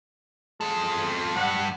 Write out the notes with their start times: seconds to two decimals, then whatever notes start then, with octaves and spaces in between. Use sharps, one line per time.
0.61 G#3 C4 A4
1.36 G2 F#5